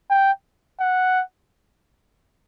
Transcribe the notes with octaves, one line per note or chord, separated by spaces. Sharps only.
G5
F#5